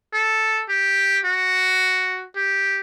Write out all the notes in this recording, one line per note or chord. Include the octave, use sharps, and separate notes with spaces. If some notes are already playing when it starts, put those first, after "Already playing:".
A4
G4
F#4
G4